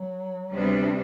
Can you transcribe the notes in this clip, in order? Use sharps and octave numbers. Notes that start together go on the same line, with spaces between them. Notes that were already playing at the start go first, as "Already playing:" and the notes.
Already playing: F#3
D2 C3 G3 B3 D4